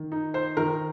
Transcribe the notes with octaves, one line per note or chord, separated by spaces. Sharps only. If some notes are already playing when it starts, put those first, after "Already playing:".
Already playing: D#3
D#4
C5
D#3 A#4